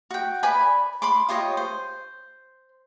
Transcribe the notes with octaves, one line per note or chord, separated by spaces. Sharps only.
F#4 G5
B4 D5 G#5 B5
B5 C6 D6
F4 G4 C#5 D#5
C5